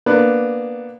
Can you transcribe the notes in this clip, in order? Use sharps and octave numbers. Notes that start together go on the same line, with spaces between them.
A#3 B3 D4 B4